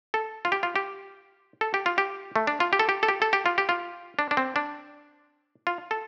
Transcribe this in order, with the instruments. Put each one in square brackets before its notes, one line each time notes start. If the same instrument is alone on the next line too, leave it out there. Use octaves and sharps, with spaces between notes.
[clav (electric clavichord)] A4
F4
G4
F4
G4
A4
G4
F4
G4
A3
D4
F4
G4
A4
G4
A4
G4
A4
G4
F4
G4
F4
D4
D4
C4
D4
F4
A4